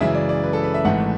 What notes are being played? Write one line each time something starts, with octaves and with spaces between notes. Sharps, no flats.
F#2 C#3 E3 G#3 E5
D5
D5
B4
A4
B4
E5
G#1 G#2 E3 A3 F#5